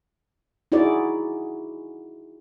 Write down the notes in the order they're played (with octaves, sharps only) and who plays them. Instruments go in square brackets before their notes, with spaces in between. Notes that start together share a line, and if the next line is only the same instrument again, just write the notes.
[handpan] D#4 E4 F#4 G#4 D5